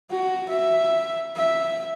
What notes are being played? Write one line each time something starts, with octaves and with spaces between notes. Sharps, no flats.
F#4
E5
E5